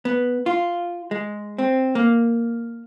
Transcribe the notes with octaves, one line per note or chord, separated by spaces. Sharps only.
B3
F4
G#3
C4
A#3